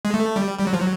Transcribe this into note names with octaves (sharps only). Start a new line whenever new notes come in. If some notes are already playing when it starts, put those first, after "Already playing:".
G#3
A3
G3
G3
F#3
F3
F#3